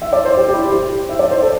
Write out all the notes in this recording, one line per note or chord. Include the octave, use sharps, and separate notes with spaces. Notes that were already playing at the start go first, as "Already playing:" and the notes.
E5
D5
C5
G4
G4
E4
G4
E5
D5
C5
A4